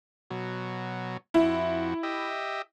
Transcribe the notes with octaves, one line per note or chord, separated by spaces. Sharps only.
B2 F#3
F2 E4 F#4
G4 D#5 E5